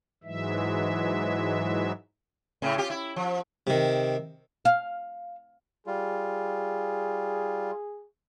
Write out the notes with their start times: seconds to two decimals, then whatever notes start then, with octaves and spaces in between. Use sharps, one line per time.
0.24 G#2 E3 F#3 G#3 E5
2.62 A2 C#3 E4
2.78 F4 G4
2.90 E4
3.16 F3
3.67 C3 D#3
4.65 F5
5.87 G3 F4 G#4